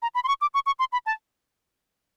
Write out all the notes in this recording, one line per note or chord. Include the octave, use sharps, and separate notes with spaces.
A#5
B5
C6
C#6
D6
C#6
C#6
C6
B5
A5